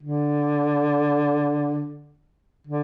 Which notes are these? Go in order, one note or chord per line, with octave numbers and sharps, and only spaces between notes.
D3
D3